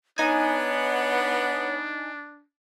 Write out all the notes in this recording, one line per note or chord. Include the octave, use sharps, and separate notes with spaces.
B3 D4 D#4 C#5 G#5